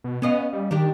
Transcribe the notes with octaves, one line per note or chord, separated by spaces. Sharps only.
B2
B3 C#4 D#5 F5
G3
D#3 D4 G4